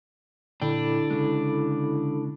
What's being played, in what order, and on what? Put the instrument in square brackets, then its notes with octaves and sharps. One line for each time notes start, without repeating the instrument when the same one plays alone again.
[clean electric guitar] A#2 G5 [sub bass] D3 [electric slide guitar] D4 [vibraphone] E4 A4 B5
[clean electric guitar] C#3 G#3